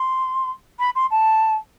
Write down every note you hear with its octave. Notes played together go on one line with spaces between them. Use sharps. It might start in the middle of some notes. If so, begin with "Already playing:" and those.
Already playing: C6
B5
C6
A5